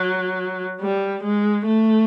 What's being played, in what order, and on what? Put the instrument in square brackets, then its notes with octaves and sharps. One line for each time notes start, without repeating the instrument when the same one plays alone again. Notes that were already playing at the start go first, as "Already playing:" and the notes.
Already playing: [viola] F#3
G3
G#3
A3